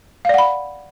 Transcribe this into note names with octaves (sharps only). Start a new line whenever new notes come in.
D5 F5 F#5 B5